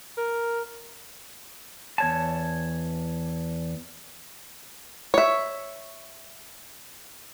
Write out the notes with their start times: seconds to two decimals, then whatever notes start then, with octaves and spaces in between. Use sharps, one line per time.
0.17 A#4
1.98 E2 C#5 A5
5.14 C#5 E5